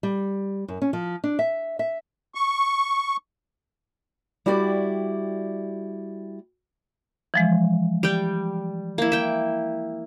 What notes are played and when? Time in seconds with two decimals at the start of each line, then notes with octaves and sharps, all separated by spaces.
0.03 G3
0.68 F#2
0.82 C#4
0.93 F3
1.24 D4
1.39 E5
1.79 E5
2.35 C#6
4.46 G3 E4 F#4 G4 C5 D5
7.34 E3 F3 G#3
8.03 G3 G5
8.98 A#3 E4
9.12 E5 G5